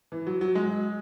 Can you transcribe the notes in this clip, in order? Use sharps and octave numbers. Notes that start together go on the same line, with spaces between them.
E3
F#3
F#3
G#3